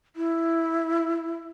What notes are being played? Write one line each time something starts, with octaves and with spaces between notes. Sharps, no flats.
E4